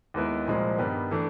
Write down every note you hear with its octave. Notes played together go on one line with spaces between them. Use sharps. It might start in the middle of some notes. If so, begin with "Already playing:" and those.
D#2 D#3 G#3 B3 E4
C2 A#2 F3 G#3 C4
G2 D#3 G3 B3
E3 A3 D4